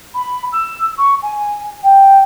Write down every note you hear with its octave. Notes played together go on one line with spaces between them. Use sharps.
B5
E6
C#6
G#5
G5